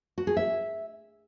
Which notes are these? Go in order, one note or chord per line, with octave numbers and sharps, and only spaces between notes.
F#4
G#4
E5